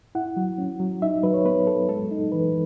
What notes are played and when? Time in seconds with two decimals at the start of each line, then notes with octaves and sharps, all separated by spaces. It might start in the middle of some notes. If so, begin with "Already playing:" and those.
0.15 E4 F#5
0.37 F#3
0.58 C#4
0.80 F#3
1.02 D#4 E5
1.23 F#3 B4
1.34 C#5
1.45 B3 B4
1.67 F#3 A4
1.88 G#3 A4
2.11 D#4
2.32 E3 B4